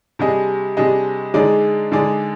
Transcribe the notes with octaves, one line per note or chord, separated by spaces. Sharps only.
C3 G3 D4 G#4 D#5
C3 G3 D4 G#4 D#5
D3 G#3 D#4 G#4 D5
D3 G#3 D#4 G#4 D5